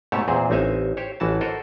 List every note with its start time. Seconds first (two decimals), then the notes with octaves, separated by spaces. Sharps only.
0.12 G#2 B2 A3 G4 C#5 A5
0.28 E2 A#2 C4 G#4 C5
0.50 A1 C4 D#4 E5 F5 G#5
0.97 G4 C5 C#5
1.20 A1 E3 F#4 A5
1.41 F#4 A4 A#4 C5 D#5